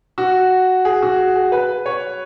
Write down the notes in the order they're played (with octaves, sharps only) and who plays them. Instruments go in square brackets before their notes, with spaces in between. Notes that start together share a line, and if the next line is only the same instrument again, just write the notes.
[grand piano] F#4
G#4
F#4
G#4
B4
C#5